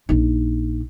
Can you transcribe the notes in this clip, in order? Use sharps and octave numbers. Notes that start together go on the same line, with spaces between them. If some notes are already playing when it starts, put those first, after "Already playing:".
A#1 D#4